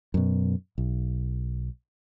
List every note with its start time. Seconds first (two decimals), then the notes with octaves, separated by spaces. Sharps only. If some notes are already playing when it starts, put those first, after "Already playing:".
0.14 F#2 B2
0.78 B1